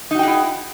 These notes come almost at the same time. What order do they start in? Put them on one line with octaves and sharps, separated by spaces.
D#4 F#4 G5 G#4 E4